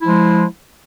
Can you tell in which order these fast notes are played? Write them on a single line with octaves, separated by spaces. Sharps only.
E4 F3 G#3